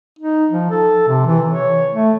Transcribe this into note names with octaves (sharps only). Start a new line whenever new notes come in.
D#4
F3
A4
C3
E3
C#5
A3